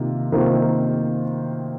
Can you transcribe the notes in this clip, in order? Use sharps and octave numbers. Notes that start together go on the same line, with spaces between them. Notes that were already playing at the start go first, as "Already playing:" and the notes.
Already playing: C3 D#3 A#3 F4
C3 D#3 A#3 F4 C5